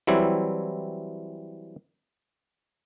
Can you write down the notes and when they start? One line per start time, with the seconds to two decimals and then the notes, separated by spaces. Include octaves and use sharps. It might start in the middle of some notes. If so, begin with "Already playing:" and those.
0.07 E3 F#3 G3 C4 E4